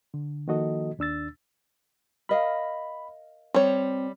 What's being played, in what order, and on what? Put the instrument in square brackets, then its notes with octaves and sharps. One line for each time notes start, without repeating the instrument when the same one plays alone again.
[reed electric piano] D3
D#3 F3 A#3 F#4 A4 D#5
D#2 D4 E6 A6
[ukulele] A#4 D#5 F5 [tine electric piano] B5
[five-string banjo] G3 C#5 [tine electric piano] C4